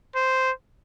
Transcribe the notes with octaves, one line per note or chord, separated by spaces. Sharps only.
C5